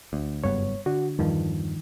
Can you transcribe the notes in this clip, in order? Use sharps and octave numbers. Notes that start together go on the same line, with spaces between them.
D2
F#1 G2 B3 C#5
D3 F#4
E2 G2 D#3 F3